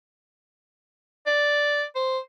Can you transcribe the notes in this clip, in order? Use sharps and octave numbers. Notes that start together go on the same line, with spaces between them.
D5
C5